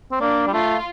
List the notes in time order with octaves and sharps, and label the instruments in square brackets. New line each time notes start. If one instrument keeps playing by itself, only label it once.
[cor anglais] C4
[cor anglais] A#3 [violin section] D4
[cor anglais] G3
[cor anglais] A3 [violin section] F4